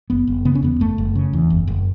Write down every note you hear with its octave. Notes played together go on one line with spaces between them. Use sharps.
F#1 B3
F#1
C#3 B3
C#4
E2 B3
F#1 A3
F#1
C#3
E2
F#1
F#1